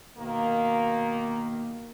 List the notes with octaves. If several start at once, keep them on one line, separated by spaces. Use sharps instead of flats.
B2 D#3 A#3